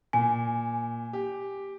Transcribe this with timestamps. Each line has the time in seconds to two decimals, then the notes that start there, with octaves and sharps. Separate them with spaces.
0.13 A#2 G#5
1.13 G4